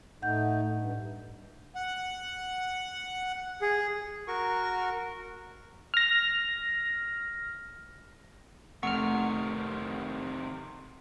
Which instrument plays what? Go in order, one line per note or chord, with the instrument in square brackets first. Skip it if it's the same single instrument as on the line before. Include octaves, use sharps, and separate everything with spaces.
[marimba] A2 F#5 G6 [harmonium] A3 D#4
[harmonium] G2
[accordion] F#5
[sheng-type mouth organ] G#4
F#4 A#4 C#6
[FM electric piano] F6 A#6
[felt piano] F1 [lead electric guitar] C3 D#3 [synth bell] F#5 [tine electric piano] C#6 F6